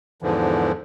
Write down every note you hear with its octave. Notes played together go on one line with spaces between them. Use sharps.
E2 G#2 D3 E3 F3